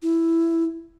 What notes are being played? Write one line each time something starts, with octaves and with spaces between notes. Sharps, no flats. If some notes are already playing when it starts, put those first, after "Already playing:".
E4